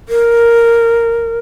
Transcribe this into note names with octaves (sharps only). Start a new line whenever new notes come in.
A#4